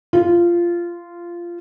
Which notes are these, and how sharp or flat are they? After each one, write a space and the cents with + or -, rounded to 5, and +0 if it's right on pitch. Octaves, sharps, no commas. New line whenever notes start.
F4 -15